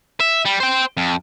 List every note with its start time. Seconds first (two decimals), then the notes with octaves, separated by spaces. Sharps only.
0.20 E5
0.45 G3
0.60 C5 G5
0.97 F2